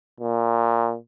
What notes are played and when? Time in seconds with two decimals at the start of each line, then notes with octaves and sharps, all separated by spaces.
0.20 A#2